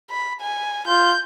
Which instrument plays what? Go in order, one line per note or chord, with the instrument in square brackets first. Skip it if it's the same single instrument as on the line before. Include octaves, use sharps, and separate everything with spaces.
[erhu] B5
G#5
[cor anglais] F4 [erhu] G6